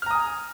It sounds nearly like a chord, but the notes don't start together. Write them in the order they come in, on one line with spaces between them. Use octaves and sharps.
F6 A#5 D#6 G#5